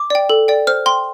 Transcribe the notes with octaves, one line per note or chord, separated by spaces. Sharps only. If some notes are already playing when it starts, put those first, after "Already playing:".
Already playing: D6
D5 G5
A4
D5 G5
C5 F6
G5 C6